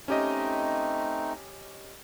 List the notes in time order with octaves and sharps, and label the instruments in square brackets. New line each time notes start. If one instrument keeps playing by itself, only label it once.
[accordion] A3 C4 D#4 [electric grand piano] C#4 G4 D#5